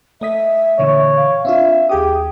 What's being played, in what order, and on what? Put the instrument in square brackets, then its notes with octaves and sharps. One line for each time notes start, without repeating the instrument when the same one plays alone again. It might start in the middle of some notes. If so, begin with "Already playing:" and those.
[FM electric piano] A3 D#5 B6 [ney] E5
[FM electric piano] A#2 D3 E3 [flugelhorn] C#5
[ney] F5
[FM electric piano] C4 D4 F4 [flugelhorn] E5
[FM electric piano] D#2 G#4 D#6 [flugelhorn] G4